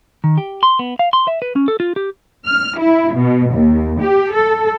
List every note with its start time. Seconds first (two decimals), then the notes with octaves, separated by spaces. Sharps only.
0.24 D#3
0.38 G4
0.63 C6
0.79 B3
0.99 F5
1.13 C6
1.28 E5
1.42 B4
1.56 C#4
1.68 A4
1.80 F4
1.96 G4
2.45 F6
2.79 E4
3.14 B2
3.53 D#2
4.01 G4
4.34 A4